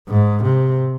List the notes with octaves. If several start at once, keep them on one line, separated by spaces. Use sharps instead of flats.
G#2
C3